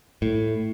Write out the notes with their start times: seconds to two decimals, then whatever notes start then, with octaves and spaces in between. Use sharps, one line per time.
0.22 A2